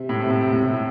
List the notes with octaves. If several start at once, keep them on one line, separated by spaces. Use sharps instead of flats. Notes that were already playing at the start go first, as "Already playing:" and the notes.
Already playing: C3
A2
C3
A2
C3
A2
C3
A2